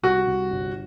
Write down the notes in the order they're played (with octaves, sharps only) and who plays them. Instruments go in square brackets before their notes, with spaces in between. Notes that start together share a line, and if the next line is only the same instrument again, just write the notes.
[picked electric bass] C2 [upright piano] F#4
[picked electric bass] C2
G1